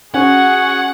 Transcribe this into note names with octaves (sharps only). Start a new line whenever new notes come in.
C#4 F#4 G#4 F#5 G#5 C#6 F#6